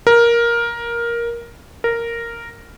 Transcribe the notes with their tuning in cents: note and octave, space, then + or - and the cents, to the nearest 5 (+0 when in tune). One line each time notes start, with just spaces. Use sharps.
A#4 +10
A#4 -5